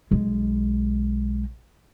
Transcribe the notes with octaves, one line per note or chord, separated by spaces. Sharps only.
B1 G#3